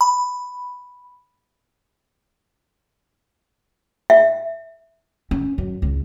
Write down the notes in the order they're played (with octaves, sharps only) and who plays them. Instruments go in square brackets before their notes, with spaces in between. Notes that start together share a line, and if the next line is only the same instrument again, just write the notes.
[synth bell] B5
[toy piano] E5
[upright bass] C#4
F#2
C#2